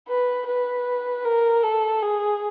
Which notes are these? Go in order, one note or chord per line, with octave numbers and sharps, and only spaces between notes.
B4
B4
A#4
A4
G#4